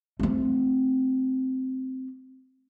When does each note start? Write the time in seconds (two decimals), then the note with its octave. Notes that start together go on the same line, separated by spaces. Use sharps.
0.19 A3 C4